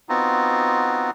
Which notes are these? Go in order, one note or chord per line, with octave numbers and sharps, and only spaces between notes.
B3 C4 D#4 F4 F#4